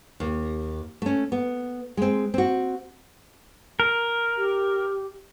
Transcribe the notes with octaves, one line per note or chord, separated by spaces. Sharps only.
D#2
A3 C#4
B3
G#3 C4
C4 F#4
A#4
G4